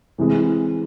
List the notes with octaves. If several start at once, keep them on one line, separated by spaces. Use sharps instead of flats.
C3 E3 G#3